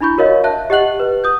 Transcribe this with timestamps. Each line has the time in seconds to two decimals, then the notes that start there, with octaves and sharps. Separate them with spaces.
0.01 D4 E4 B5 C#6 G6
0.18 F#4 A#4 C#5 D#5 F5
0.44 E5 A5 F#6
0.70 G4 D#5 F#5 F#6 F#7
1.00 B4
1.24 D#6 G6